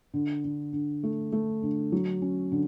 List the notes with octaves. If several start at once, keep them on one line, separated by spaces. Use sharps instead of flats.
D3
D3
D3
A3
A3
D3
F#3
C#4
D3